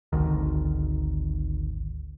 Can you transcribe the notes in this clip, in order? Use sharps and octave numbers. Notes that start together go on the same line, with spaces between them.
G#1 D2 D#3